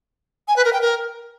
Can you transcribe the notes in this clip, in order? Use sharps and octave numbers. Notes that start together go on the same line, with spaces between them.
G#5
B4
A#4
G5
A#4